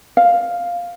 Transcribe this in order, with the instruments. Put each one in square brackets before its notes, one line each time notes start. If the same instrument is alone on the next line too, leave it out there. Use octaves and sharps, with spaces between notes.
[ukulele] F5